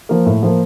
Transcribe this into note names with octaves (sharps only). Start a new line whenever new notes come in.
F3 A#3
A2
F3 A#3